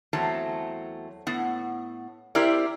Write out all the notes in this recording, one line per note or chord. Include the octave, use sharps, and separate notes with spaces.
E2 F#3 A3 C4 A5
A2 B3 F#5
C4 E4 G4 A#4 C5 D5